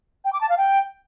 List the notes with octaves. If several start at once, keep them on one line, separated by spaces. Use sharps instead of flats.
G5
D6
A5
F5
G5